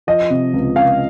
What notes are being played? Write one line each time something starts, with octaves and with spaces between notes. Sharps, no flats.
F3 D#5
C3
C#2
C#2 F5